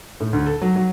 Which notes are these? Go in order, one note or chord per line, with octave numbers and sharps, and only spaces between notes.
A2
D2
A4
F#3
F#3